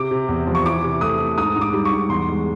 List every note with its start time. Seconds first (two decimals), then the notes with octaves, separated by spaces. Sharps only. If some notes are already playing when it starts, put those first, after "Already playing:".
Already playing: C3 D6
0.11 C3
0.28 E2
0.47 F3
0.55 C#6
0.65 E3 D6
0.84 C3
1.01 A3 D#6
1.20 A3
1.37 G#2 D#6
1.55 G#2
1.61 D6
1.73 G3
1.85 C#6
1.91 G#2
2.09 E2 C6
2.28 G#3